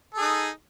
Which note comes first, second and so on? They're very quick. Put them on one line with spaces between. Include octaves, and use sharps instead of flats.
A4 G#4 D#4